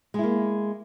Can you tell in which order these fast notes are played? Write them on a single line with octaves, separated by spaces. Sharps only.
G#3 E4 A#3